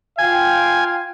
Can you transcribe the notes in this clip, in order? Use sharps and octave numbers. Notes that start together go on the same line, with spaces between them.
F4 F5 G5 G#5